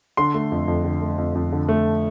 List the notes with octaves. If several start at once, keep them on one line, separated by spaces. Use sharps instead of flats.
D3 C6
A3
F2
F2
D3
A3
F2
F2
D3
A3